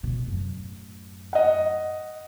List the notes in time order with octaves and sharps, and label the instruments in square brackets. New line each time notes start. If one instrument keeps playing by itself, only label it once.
[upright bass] B2
F#2 A2
[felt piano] D#5 F#5